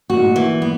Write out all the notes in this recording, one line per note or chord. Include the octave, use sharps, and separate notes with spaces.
A#2 F#4
G#2
A#2
E3
B3